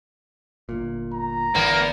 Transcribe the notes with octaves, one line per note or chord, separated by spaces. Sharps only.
G1 A#2
A#5
G1 E2 A#3 B3